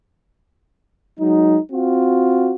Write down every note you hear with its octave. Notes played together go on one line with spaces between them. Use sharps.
F#3 G#3 D#4
C4 F4 F#4